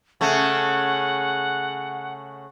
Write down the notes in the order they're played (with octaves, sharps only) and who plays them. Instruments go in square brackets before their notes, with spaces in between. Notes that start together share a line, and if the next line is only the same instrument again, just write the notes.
[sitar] C#3 A3 [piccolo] F#5